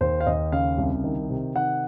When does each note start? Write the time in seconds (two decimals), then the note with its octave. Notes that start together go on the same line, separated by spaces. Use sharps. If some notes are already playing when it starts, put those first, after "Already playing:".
0.01 D#2 C5
0.20 F5
0.27 D#2 D#5
0.52 C#3 F5
0.78 C2
1.04 D#3
1.30 C3
1.56 D#3 F#5